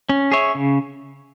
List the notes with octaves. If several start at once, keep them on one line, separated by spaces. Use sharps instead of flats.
C#4
G#4 C#5 E5
C#3